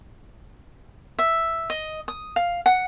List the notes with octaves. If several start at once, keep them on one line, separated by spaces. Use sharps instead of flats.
E5
D#5
D#6
F5
F#5